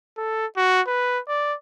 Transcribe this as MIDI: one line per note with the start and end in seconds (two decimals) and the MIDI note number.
0.18 0.46 69
0.57 0.82 66
0.87 1.19 71
1.28 1.55 74